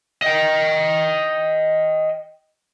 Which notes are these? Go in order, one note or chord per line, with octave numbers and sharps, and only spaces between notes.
D#5 G5